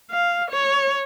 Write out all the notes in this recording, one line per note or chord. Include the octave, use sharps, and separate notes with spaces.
F5
C#5